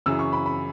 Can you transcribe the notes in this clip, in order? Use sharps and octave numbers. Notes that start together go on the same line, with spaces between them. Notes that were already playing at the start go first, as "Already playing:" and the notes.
F#2 C#3 E3 E6
C#6
B5
B5